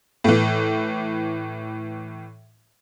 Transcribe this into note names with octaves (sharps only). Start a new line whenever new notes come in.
A2 E3